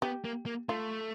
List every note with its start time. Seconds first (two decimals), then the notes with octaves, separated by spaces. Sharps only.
0.02 B3 G4
0.25 A#3
0.46 A#3
0.69 A3 F4